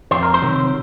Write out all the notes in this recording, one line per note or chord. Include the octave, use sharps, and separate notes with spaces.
F2 C5
A#4
C5
C3 D#3 F#3